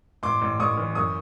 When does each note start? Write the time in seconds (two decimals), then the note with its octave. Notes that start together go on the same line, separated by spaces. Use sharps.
0.23 A1 C6 D6
0.42 A1
0.60 A1 C#6 D#6
0.77 E3
0.95 F#2 C#6 D#6